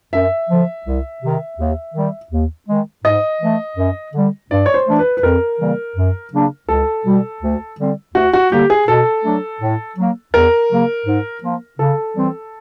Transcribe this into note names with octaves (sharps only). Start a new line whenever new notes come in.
F#2 E5
D3 F3
C2
C3 D#3
D#2
D#3 G3
D#2
D#3 G#3
G#2 D#5
E3 A3
F#2
D3 G3
G2 D5
C#5
C5
E3 A3 D4
B4
B4
F2 A#4
C#3 E3 G3 A#3
F#2
C#3 F#3 A#3 D4
C#2 A4
B2 G3
D2
D3 G3 C4
D2 F#4
F#4
D3 G3 A#3 G4
G#4
B2 A4
F#3 A3 D4
A2
F#3 A#3
E2 A#4
C#3 F#3 A#3
G#2
F3 A#3
C#3 A4
E3 G3 C4